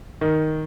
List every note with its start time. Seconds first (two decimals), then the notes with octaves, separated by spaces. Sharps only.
0.21 D#3